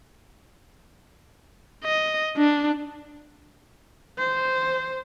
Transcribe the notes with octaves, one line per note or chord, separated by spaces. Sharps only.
D#5
D4
C5